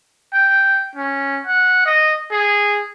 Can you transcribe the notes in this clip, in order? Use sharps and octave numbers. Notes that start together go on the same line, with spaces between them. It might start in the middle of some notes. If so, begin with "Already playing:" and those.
G5
C#4
F#5
D#5
G#4